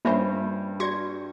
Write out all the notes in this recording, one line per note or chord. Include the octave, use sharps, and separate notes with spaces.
G2 A#3 C#4 F4 C5 E5 B5
F#4 D5 C#6 G#6 A#6